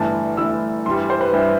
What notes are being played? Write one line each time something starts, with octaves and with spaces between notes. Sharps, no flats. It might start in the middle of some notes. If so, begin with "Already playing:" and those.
Already playing: G1 G2 E3 A3 A5
G1 G2 E3 A3 E6
G2 E3 G3 C6
C5
B4
G2 E3 G3 E5